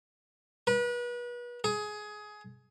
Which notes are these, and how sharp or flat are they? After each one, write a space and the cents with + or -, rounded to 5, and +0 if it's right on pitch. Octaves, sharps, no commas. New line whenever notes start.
B4 -35
G#4 +20